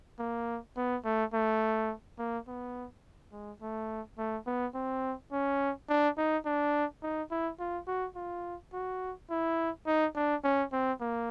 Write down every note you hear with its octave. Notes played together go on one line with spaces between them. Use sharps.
A#3
B3
A3
A3
A#3
B3
G#3
A3
A3
B3
C4
C#4
D4
D#4
D4
D#4
E4
F4
F#4
F4
F#4
E4
D#4
D4
C#4
C4
A#3